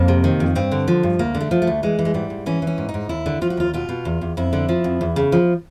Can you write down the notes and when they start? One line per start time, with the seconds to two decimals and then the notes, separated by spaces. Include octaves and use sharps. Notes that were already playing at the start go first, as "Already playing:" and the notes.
Already playing: F2 A#3
0.08 C3
0.24 D#3
0.40 F2
0.55 G2 C4
0.72 D3
0.88 F3
1.03 G2
1.19 D2 A#3
1.35 D3
1.41 A3
1.51 F3
1.62 A3
1.67 D2
1.83 E3 G#3
1.99 E3
2.05 G#3
2.14 G#2 G3
2.30 G#2
2.46 E3 C#4
2.62 E3
2.67 C#4
2.78 G#2
2.89 D#4
2.94 G#2
3.09 D#2 E4
3.26 D3
3.41 F3 F4
3.50 F#4
3.57 D#2 F4
3.74 B2 F4
3.89 B2
4.05 E2
4.21 E2
4.37 F2 E4
4.53 D3
4.69 F3
4.84 F2
5.01 E2
5.16 C#3
5.32 F3